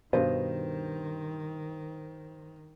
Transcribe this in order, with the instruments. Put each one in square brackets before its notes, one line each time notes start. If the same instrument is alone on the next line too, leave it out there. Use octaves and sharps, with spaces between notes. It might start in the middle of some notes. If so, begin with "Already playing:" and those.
[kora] G2 D#5 [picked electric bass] B2 [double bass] D#3 [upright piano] C5